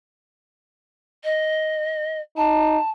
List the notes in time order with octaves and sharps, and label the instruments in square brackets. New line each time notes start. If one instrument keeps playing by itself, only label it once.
[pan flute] D#5
[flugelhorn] D#4 [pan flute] A5